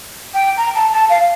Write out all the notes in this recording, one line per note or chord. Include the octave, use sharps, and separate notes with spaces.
G5
A#5
A5
A5
F5